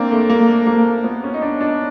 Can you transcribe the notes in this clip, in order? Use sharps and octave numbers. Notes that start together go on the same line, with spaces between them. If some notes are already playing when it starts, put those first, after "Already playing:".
Already playing: A#3 C4 D4
A3
A#3
A3
A#3
B3
C#4
D#4
D4
D4